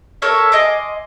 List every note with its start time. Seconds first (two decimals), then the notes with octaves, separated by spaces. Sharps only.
0.22 A4 A#4 C#5 E5
0.52 D#5 G#5 C6 D6